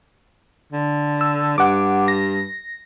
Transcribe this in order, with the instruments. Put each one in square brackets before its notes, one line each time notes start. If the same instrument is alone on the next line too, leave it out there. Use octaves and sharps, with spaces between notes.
[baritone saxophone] D3
[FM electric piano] E6
[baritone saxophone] G2 [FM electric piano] F#5 D6
[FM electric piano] A#6